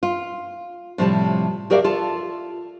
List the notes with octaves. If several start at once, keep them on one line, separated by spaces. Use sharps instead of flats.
F4
A2 C3 F3 G3 G#5 A5
F#4 G4 A#4 D5 E5 F5
F4 A4 A5